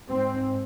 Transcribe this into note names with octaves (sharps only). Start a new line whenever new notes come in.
G#2 C4